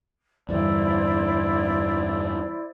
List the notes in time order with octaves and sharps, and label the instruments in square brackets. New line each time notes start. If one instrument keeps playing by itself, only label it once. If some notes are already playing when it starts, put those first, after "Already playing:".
[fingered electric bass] E2 G2 D3 [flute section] E4 C5 D5